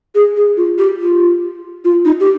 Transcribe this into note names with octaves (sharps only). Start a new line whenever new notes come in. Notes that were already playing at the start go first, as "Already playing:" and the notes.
G#4
G#4
F4
G4
F4
F4
D#4
G4